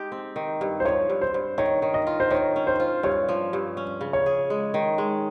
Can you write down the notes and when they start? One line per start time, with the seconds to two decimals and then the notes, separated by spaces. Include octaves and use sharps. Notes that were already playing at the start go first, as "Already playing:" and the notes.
Already playing: G#3 D#4 G4
0.12 C4
0.36 D#3
0.61 G2
0.80 C5
0.85 F3 C#5
1.10 G2
1.22 C5
1.34 G2
1.58 D#3 C#5
1.82 D#3
1.94 D#5
2.07 F4
2.20 C5
2.31 D#3 C#5
2.56 C#4
2.67 C5
2.80 F4
3.03 G2 C#5
3.29 F3
3.53 G2
3.77 C#4
4.01 C#3
4.13 C#5
4.26 G#4
4.50 G#3
4.74 D#3
4.98 G#3